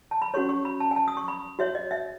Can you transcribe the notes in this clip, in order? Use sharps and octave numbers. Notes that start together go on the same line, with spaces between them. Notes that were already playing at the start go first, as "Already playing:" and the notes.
A5
B5
C#4 F#4 A4 C#5 C#6
C#6
B5
A5
G#5
A5
D#6
C#6
B5
F#4 C#5 E5
D#5
E5